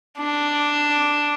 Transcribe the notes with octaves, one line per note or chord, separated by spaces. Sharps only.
D4